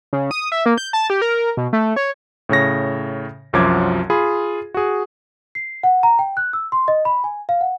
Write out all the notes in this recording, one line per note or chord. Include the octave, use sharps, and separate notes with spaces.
C#3
D#6
E5
A#3
G6
A5
G4
A#4
B2
A3
C#5
A2 C#3 C#5 A#6
C2 F#2 F3 F#3 D6 G#6
F4 G#4 B5
F#4 G#4
C7
F#5
A#5
G5
F#6
E6
C6
D#5
B5
G#5
F5
F#5